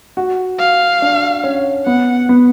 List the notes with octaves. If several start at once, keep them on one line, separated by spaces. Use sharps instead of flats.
F#4
F5
D4
C#4
B3 F#5
B3